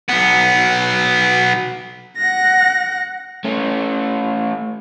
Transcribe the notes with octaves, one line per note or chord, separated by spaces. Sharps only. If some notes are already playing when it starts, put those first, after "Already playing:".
B1 B3
F#5 A#6
A3 C#4